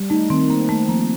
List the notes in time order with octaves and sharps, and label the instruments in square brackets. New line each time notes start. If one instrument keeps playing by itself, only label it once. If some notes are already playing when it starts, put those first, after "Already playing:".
Already playing: [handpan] G3
[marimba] A3 [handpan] D#4
[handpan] D#3 [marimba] C4
[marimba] A#3 [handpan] C4
[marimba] A3 [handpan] C4
[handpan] F3 [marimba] A#3